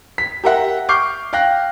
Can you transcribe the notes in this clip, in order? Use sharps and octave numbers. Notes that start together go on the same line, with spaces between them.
B6
G4 A#4 E5 F#5
C#6 D6 F6 G6 C7
F5 G5 F#6 A#6